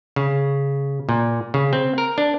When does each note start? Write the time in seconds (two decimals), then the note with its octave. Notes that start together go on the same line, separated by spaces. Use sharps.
0.16 C#3
1.09 A#2
1.54 C#3
1.73 C4
1.98 A#4
2.18 D4